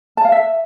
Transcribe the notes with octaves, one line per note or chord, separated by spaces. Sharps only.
A5
F5
E5